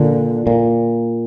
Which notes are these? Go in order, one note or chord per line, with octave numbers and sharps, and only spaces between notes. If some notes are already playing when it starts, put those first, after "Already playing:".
Already playing: A#2 D3
A#2